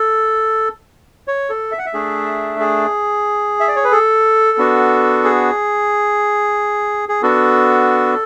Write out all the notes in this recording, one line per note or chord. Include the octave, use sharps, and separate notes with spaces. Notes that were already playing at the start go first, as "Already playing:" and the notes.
Already playing: A4
C#5
A4
E5
F#5
E5
A3 D4 G#4
G#4
E5
D5
C#5
B4
A4
B3 D4 F#4
G#4
G#4
B3 D4 F#4 A4